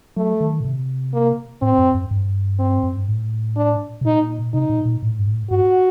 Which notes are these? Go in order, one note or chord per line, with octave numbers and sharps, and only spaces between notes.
F#3 A3
D#3
A#2
C3
A#3
A2 C4
F#2
F#2
G2
C4
F#2
G2
A2
D4
C3
A#2 D#4
C3 D#4
A#2
A#2
A2
G2
A2
G2 F#4